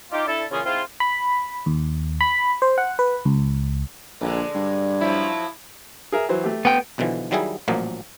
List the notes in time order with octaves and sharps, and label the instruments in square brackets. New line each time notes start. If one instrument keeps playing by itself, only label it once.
[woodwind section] D#4 F4 G4
D4 E4 A4
A#2 C#3 E3 C#4 F4 G#4
G#2 C4 E4 F4
[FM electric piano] B5
D#2
B5
C5
F#5
B4
C#2
[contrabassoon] A#1 [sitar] D3 G#3
[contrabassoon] G2
[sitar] F3 F#3 [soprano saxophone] E4
[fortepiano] G#4 A#4 E5
E3 F#3 C5
A3 G4
[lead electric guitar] B3 G5
[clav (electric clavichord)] B1 B2 D3 E3 F3
D#3 F#3 G3 E4 G#4
A1 A#2 F3 F#3 A#3